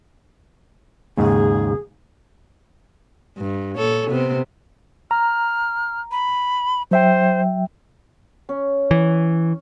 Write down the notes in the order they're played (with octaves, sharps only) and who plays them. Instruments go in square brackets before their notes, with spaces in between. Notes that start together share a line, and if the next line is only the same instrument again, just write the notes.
[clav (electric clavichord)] D#2 G#2 C#3 [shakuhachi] G#4
[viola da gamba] G2
A#2 A4 C#5
C3 B3 C4
[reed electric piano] A#5 [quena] F6
[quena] B5
[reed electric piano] F#3 E5 G5 [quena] C5
[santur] C#4
[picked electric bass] E3